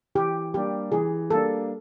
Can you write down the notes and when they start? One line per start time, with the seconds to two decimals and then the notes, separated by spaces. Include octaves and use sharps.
0.15 E3 G4
0.54 G3 A#3 D4 G4
0.92 E3 G#4
1.30 G3 A#3 D4 A4